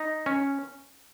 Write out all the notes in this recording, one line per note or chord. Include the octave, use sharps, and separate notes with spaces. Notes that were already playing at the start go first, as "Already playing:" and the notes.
Already playing: D#4
C#4